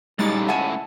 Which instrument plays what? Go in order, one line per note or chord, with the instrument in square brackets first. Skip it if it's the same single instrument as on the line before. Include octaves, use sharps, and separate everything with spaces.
[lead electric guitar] C#2 A2 [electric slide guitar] G3 D#4 G4 [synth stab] G#3 A6
[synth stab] E5 [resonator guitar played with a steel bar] F#5 G#5 [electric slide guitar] A5